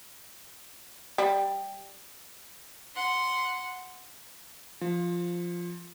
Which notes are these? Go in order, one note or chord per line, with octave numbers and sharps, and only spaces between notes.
G3
F#5 C6
F3